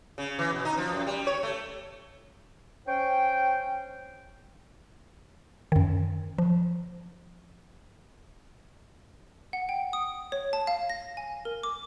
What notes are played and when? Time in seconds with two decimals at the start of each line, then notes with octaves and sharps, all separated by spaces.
0.18 C#3
0.39 E3
0.53 B2
0.65 D#4
0.78 F3
0.92 F#2
1.06 G3
1.27 C#5
1.43 A3
2.87 C#4 C5 G5
5.72 F#2 D#3
6.38 F3
9.53 F#5
9.69 G5
9.93 D#6
10.32 C#5
10.53 A5
10.67 F5
10.90 A#6
11.17 G#5
11.45 A#4
11.63 D6